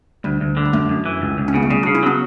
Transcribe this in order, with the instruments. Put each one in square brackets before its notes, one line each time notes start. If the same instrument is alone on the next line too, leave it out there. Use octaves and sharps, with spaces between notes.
[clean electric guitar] D2 [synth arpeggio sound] G3
[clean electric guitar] D2
D3
[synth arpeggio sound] G3
[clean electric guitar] F#2 [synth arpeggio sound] A3
[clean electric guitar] F#2
E3
C#2
C#2
[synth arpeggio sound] C#4
[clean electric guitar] C#3 [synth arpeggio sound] B3
[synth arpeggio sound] A3
[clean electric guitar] C#3 [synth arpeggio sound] G3
[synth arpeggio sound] D4 F#4
[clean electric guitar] C#3
[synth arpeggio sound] C#4 E4
[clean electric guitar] F#3 [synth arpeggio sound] B3 D4